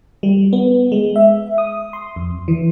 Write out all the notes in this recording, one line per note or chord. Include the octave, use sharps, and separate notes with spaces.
G3
B3
G#3
E5
D#6
C6
F2
E3